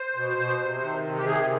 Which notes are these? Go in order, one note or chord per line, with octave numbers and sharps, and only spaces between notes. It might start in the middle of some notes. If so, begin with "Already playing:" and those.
Already playing: C5
B2
B2
C3
D#3
C3
G4
D#3 G#4